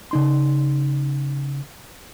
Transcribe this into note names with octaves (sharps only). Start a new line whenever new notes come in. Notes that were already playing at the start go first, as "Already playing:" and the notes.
C#3 D#4 C6